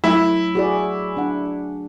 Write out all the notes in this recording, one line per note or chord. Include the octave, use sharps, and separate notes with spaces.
F#3 A3 E4
F#4 G#4 D5
D4 F#5